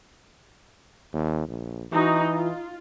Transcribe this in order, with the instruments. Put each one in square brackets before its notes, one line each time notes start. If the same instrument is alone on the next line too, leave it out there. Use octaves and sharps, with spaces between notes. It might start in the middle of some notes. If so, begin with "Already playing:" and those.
[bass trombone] D#2
A#1
[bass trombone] E3 [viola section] D#4 F#4
[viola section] F4